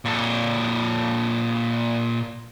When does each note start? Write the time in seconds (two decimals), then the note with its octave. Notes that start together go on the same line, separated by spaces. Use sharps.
0.05 A#2 A4